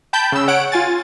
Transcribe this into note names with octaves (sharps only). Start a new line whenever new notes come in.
G5 A5 B5 G6
C#3 E6
C#5 F#5 F#6 D7
F4 G#5 A6